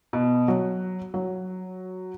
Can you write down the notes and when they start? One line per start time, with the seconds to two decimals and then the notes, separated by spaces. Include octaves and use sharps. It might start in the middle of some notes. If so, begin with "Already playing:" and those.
0.13 B2
0.48 F#3
1.14 F#3